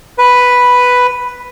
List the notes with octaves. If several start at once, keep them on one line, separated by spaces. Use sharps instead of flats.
B4